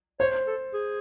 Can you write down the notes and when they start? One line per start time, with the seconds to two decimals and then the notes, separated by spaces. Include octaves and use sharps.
0.20 C5 C#5
0.47 A4
0.73 G#4